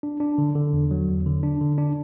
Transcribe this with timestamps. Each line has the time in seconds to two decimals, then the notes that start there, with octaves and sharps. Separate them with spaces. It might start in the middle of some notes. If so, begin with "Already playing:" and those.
0.03 D4
0.20 D4
0.38 D3
0.56 D3
0.73 E2
0.91 F#3
1.08 E2
1.26 D3
1.43 D4
1.61 D3
1.78 D4